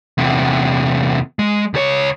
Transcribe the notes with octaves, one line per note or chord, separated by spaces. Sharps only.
E2 C3
G#3
C#2 C#5